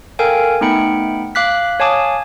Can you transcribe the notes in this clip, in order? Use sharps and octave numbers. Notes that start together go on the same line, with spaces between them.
A4 A#4 F5 G5 G#5
A3 B3 D#4 G5 B5 C#7
F5 D6 F#6 B6
C#5 F5 G#5 A5 D6 D#6